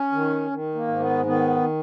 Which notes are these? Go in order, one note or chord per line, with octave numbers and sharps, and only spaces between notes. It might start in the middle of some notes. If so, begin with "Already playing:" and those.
Already playing: C#4
D#3
D#3
A#3
G#2
B3
D#3 B3